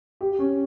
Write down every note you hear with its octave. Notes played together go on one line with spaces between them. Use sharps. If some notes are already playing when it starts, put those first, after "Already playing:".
G4
C#4